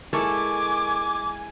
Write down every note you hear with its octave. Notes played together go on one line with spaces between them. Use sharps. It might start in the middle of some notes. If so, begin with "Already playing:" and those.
G#3 E4 A4 A#4 G#5 C#6 D6